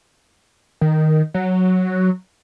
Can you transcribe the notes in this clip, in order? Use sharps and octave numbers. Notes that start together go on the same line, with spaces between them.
D#3
F#3